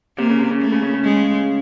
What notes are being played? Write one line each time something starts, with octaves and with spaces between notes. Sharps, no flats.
C3 A#3
C#3
C3
C#3
A3
C#3
C#3
C#3
G#3